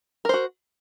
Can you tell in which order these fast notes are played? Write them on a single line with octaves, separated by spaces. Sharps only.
A#4 C5 F#4